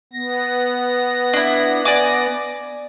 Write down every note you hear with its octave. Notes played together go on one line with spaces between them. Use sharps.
B3 A#6
D4 E4
D5 G#5 D6